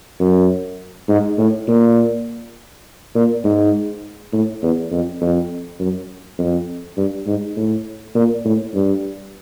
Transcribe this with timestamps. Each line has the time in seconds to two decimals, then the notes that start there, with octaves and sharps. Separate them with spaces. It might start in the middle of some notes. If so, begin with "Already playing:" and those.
0.20 F#2
1.09 G#2
1.38 A2
1.68 A#2
3.15 A#2
3.45 G#2
4.33 A2
4.62 E2
4.91 F2
5.21 F2
5.80 F#2
6.38 F2
6.97 G2
7.27 G#2
7.56 A2
8.15 A#2
8.45 A2
8.74 G2